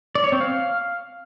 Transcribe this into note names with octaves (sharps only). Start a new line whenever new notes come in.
D5
C#5
C4
F5